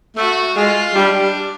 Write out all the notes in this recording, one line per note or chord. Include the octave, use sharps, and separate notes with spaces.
A3 F#4
G#3 F4
G3 D4